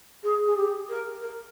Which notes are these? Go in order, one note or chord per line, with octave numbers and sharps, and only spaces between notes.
G#4
G#4
G4
A#4
A#4